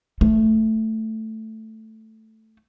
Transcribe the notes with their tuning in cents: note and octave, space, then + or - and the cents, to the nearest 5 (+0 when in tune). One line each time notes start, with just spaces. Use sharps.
A3 +5